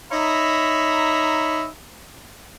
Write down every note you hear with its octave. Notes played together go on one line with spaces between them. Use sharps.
D#4 C#5 E5 A#5 B5